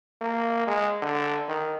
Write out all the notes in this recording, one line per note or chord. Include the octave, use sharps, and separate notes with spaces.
A#3
G#3
D3
D#3